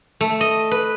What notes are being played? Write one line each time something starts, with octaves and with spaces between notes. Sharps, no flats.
A3
D#5
B4